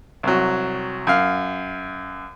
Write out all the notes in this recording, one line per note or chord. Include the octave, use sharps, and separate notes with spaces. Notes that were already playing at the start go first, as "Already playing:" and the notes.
C2 F#3
F#2 F5